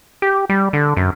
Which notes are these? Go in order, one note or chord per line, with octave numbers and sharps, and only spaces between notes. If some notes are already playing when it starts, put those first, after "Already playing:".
G4
G3
D3
F#2